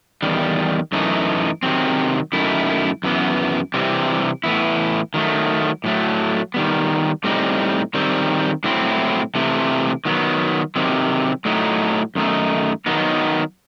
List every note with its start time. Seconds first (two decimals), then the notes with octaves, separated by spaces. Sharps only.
0.23 E2 D#3 G3
0.92 F#2 E3 A3 D#4
1.63 C3 D#3 F#3 C4
2.33 F#2 D#3 A3 E4
3.04 F#2 E3 B3
3.74 C3 E3 G3 C4
4.44 A2 E3 B3 E4
5.14 D#3 F#3 A3
5.84 A2 F#3 A3
6.54 D#3 G3 B3
7.24 A2 G3 C4 D#4
7.94 D#3 G3 C4
8.64 A2 F#3 C4 E4
9.35 C3 E3 A3
10.05 D#3 F#3 B3
10.76 C3 D#3 F#3 C4
11.45 A2 F#3 A3 D#4
12.15 F#2 D#3 A3 D#4
12.86 D#3 F#3 B3 D#4